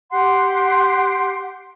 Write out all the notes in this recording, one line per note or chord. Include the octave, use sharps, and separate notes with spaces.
G4 F#5 C6